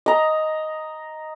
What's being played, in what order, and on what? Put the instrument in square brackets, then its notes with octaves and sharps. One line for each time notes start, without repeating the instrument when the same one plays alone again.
[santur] D#5 A#5